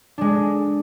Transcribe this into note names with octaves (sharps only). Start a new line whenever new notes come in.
G#3 D4